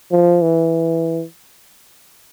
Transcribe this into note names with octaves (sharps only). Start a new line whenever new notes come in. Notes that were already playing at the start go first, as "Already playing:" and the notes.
F3
E3